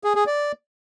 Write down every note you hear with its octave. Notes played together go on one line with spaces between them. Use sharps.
G#4
G#4
D5